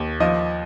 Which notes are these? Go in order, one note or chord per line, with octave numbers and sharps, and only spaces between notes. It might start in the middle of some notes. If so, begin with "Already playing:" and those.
Already playing: D#2
F3 D#5